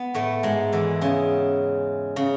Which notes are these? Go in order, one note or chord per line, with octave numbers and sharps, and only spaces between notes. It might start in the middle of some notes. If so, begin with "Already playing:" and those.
Already playing: B3
A2 A3
G#2 G#3
E2 E3
C#3
C#3